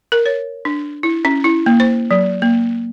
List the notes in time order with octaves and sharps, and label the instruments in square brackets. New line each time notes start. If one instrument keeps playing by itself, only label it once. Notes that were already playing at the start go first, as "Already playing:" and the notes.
[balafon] A#4
C#5
D4
E4
C#4
E4
A#3
C5
F#3
A#3